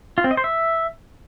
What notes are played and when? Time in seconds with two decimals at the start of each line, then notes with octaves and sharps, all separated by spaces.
0.18 F4
0.24 C4
0.31 D#5
0.37 C5
0.44 E5